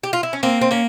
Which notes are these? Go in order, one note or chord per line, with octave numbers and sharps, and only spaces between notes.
G4
F4
E4
C#4
A#3 C4
C4
A#3 C#4